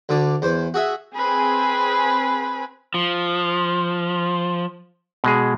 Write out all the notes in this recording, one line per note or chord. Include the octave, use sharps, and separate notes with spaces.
D2 D3 D5 D6
E2 C5
F#4 G#4 E5
C4 G#4 B4
F3
B2 G#3 G#4